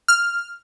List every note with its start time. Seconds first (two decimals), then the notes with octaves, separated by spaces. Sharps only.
0.08 F6